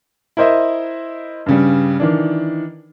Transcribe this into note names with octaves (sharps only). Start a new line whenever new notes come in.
E4 A#4 C5 D#5 E5
G2 C#3 G3
D#3 E3 D4